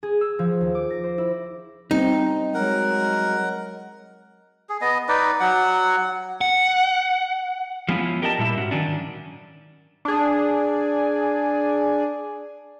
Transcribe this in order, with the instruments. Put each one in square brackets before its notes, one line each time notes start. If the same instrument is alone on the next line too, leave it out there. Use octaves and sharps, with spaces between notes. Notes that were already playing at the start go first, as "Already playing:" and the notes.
[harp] G#4
E6
F3
D#2
D6
A#6
C5
E4
[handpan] G3 C4 C#4 [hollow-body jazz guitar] D#4
[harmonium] F#3 G#3 [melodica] A#4 F#5
[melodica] G#4
B3 D#5
D#4 B4 D5
F#3 F#5
[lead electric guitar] F#5
[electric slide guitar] F3 G#3 B3 C#4 E4 F4
G4 A#4 D5 D#5 F5 A5
A#2 G3 A3 E4 E5
G#2 C#4 F#4
D#3 F#3 C#4 D4
[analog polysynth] D4 G#4